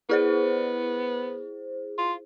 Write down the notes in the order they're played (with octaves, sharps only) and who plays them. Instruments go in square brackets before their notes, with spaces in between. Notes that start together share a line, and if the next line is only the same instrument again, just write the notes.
[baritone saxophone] B3 [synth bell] E4 G#4 C5
[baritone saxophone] F4